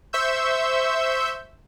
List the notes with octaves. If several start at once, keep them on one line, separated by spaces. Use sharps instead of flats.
C5 E5 C#6 E6 G6